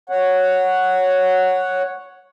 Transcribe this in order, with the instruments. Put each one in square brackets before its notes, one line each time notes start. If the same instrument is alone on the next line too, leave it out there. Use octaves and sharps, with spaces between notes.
[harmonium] C#5 F#5